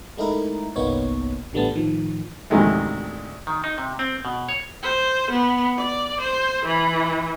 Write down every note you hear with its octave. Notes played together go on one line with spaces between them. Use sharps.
G#3 A3 D#4 E4 A#4
G1 C2 A#3 B3 D#4 C#5
A1 D3 G3 A3 B3 A5
A2 D#3 F3
A1 D2 C3 D#3 G#3 A3
D#3
D#4
C3
C4
B2
C#5
C5
B3
D5
C5
E3